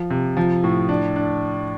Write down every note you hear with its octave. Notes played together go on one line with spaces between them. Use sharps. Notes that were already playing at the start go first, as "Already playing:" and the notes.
Already playing: F3
C3
F3
A2
D4
D4